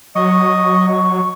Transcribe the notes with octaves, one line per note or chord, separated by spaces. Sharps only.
F#3 D#5 C#6